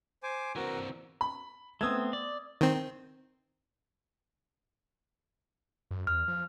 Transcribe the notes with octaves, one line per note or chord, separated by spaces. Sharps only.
C5 G#5 D6
E3 C4 F#4 A#4
B5
A3 B3 C4 D#6 E6 G#6
D5
D#3 C4
F#2
E2 F6
F3